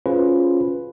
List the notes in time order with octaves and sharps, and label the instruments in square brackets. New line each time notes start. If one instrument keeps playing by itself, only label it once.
[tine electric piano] C#4 F4 F#4 G#4 B4 C5